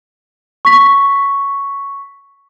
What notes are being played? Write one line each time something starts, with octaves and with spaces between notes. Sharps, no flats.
C#6 B6